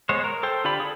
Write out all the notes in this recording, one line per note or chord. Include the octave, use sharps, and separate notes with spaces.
G#3 B3 C5 C#5
A#4
A4 C5 G5
D3 F4 G4 D5 B5
G#4 A4